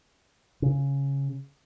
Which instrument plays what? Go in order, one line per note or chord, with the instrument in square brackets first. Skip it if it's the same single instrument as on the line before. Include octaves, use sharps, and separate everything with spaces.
[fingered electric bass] C#3